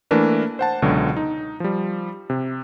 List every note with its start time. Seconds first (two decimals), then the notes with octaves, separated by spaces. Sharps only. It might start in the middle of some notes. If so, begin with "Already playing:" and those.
0.11 E3 A3 A#3 D4 A#4 B4
0.59 C5 F#5 A5
0.82 C#2 B2 D3 F#3
1.17 D#4
1.60 F3 G3
2.30 C3